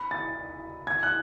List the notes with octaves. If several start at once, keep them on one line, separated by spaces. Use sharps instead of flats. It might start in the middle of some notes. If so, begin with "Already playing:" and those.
Already playing: B5
A6
G#6
F#6